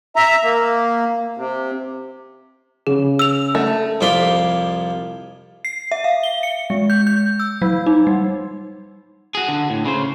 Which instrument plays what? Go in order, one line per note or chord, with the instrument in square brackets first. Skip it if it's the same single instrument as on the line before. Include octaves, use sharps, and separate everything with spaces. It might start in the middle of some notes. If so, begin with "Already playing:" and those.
[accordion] E5 A#5
A#3
C3
[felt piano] C#3 [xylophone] G#4
[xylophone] E6 F7
[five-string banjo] A3
[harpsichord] C2 F2 F3 D5 B5 C6
[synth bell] C7
E5
F5
G7
C#7
G#3
G6
G6
E6
F#3
D#4
G3
[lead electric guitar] F#4 G#4
D3
A2
C#3 C5